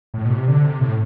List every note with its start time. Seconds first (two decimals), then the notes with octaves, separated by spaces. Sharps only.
0.14 A2
0.25 B2
0.31 C3
0.48 D3
0.64 C3
0.81 A2